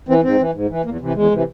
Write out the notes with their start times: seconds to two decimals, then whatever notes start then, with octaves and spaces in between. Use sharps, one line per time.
0.08 E3 C4
0.23 G#2 C4
0.39 E3
0.54 G#2
0.69 E3
0.85 E2 A#3
1.00 C3 E3
1.15 E2 G#3
1.31 C3 E3